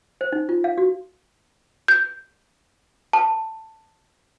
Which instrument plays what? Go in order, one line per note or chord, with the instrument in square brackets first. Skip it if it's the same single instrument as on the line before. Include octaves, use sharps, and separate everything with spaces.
[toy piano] C5
D#4
F4
F5
F#4
[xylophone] G6
A5